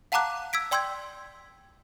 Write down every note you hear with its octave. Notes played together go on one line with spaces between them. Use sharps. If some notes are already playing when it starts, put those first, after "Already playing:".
F5 F#5 A5 A#5 D6 F#6
E6 G#6 B6 D7
D5 G5 C6 E6 G6 G#6